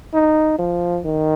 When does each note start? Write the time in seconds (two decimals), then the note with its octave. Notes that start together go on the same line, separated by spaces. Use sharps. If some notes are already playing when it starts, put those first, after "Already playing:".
0.14 D#4
0.59 F3
1.05 D#3